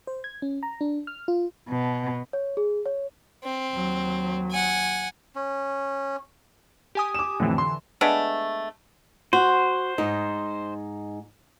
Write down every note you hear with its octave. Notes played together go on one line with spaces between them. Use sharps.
C5
G#6
C#4
A#5
D4
F6
F4
B2
C#5
G#4
C#5
C4
D#2 F#3
F#5 G#5
C#4
G4 G#5 D#6
D6 E7
F2 A2 D3 E3
C6
G#3 A3 B3 D4
F#4 C5
G#2 D#4